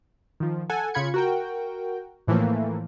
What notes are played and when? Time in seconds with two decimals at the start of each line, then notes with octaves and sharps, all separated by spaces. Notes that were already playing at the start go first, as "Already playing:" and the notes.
0.40 D#3 F3
0.70 A4 F#5 G#5
0.94 C#3 F4 B5 G#6 C#7
1.14 F#4 A#4 G5
2.27 A2 E3 F3 A3 A#3